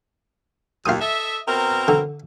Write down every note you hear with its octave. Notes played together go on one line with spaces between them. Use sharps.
D#2 F4 D#6
A4 D#5 E5
B2 C4 A#4
D3